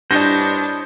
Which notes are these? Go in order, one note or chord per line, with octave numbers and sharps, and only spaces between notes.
G2 D4 E4 C5 C#5 D#5 G6 A#6